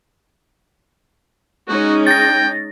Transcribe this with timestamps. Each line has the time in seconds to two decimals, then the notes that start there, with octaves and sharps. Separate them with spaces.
1.68 G#3 C#4 D#4 F#4
2.07 G5 A6 A#6